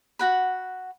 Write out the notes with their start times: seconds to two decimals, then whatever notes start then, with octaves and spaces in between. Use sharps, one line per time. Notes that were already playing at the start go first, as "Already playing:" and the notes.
0.19 F#4 F#5 B5